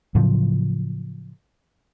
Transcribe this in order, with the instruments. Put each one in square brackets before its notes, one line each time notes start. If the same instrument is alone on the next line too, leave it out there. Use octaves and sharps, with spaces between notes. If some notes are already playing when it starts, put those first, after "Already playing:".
[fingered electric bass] A2 C#3 F3 F#3